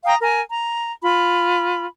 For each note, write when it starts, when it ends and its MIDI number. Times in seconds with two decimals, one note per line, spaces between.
0.05 0.15 77
0.05 0.15 79
0.05 0.15 82
0.05 0.15 87
0.21 0.40 70
0.21 0.40 80
0.50 0.92 82
1.03 1.85 65
1.03 1.85 83